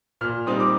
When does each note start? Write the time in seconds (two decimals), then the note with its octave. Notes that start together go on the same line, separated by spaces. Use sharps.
0.21 A#2 F6
0.46 G3 C4 D#4 D#6
0.60 D6